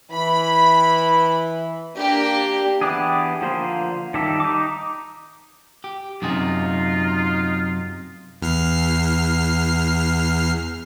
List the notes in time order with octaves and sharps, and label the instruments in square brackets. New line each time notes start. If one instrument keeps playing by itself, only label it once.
[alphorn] E3 [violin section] B5
[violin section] A#3 D4 G4
[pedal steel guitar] E3 B3 D4 G4 G#4
D3 F3 A#3 C5
D#3 G3 G4 A4 E5
D#4 D6
[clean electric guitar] G4
[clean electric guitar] F#2 C3 G#4 [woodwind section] D#4 F4
[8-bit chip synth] E2 F6 C7